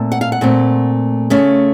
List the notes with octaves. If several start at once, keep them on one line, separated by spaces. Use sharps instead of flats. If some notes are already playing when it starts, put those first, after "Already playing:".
Already playing: A#2 A3 C4
F#5
F5
F#5
A#2 A3 C4
C#3 A3 C#4